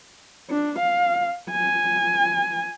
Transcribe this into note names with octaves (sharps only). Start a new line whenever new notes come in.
D4
F5
G#5